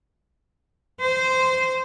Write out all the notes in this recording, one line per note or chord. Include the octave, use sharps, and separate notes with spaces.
C5